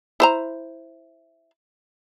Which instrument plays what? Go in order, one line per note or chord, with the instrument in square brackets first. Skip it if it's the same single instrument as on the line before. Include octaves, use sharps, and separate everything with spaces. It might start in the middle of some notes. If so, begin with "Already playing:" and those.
[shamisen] E4 C5 A#5